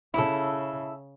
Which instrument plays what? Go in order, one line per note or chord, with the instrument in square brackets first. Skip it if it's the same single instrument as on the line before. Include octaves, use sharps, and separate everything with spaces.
[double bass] C#3 [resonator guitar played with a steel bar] E4 A4